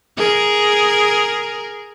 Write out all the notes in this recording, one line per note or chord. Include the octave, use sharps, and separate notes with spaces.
G#4 A#4